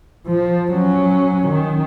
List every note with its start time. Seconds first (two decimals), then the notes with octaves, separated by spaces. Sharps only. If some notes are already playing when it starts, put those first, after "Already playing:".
0.27 F3
0.72 F#3 C#4
1.48 D#3